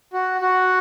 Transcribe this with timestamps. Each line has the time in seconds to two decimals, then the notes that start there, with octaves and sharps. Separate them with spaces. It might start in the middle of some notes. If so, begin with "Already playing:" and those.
0.13 F#4
0.41 F#4